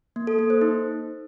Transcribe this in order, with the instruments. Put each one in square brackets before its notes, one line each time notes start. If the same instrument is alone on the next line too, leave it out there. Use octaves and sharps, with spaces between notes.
[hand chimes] A#3
A4
A#3
C5
D#4